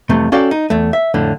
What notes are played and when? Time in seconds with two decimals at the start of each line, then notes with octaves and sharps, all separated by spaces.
0.09 C2 F2 C3 E3 A3
0.32 C#4 F#4 A4 D5 F5 G5
0.51 D#4
0.70 E2 A3
0.93 E5
1.14 F2 A2 D3